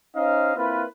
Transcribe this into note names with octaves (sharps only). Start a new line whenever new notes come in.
C#4 D#4 C5 D#5 F5
A#3 C4 E4 F4 B4